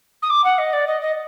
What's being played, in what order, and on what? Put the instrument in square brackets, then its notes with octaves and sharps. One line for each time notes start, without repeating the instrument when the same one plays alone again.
[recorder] D#6
D6
F#5
D#5
D5
D#5
D#5